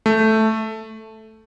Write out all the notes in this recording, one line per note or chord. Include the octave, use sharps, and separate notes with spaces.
A3